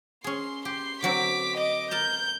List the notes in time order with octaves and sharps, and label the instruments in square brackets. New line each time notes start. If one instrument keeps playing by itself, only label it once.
[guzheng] C#4 G#4 [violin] C6
[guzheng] G4 [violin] C6
[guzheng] D3 F#3 C4 [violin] D6 B6
[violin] D#5 D6
[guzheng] A#4 A5 A#5 [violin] G6